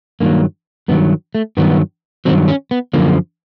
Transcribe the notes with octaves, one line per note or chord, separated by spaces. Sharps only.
G2 D#3 F#3 A#3
G2 D#3 F#3 B3
A3
G2 D#3 F#3 B3
G2 D#3 F#3 C4
C#4
B3
F#2 D3 F3 A#3